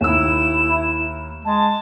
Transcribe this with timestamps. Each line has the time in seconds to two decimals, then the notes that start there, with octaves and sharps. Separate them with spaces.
0.01 D#2 E4 E6 E7
1.45 G#3 A5